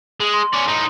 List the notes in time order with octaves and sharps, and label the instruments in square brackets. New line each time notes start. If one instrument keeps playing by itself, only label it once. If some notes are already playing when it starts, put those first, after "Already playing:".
[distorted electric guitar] G#3
[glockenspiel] C6
[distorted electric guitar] C#4 D5
A2 D#4